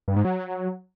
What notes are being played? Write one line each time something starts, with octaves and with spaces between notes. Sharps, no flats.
G2
G#2
F#3